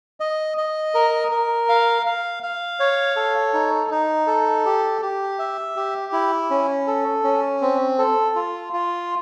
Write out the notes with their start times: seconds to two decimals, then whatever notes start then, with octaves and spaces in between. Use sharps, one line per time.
0.20 D#5
0.57 D#5
0.94 A#4
1.32 A#4
1.69 F5
2.06 F5
2.43 F5
2.80 C#5
3.16 A4
3.54 D#4
3.90 D#4
4.27 A4
4.65 G4
5.02 G4
5.39 E5
5.76 G4
6.13 E4
6.50 C#4
6.87 A4
7.24 C#4
7.61 C4
7.98 A4
8.36 F4
8.73 F4